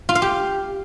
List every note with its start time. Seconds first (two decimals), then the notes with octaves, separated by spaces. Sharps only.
0.09 F4
0.15 F5
0.22 G4